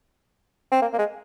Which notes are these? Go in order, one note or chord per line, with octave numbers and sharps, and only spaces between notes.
C4
A#3
A#3
G#3